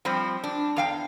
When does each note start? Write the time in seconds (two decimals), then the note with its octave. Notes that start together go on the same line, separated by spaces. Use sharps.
0.05 F3 G3 C4
0.44 D4
0.76 E2 F5 G5